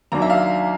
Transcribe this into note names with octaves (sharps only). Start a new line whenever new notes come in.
D#2 D#3 F#3 A#3 D4 A#5
E5
F5